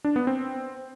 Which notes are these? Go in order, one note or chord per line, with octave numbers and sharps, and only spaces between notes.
D4
B3
C4